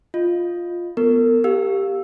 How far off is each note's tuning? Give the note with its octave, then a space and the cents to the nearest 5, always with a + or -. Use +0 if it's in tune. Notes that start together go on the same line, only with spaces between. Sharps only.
F4 +0 D#5 +0
B3 +0 A#4 -40
G4 +0 F5 +10 E6 +0